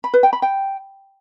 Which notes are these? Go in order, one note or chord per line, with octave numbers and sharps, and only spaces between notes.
B5
B4
G5
B5
G5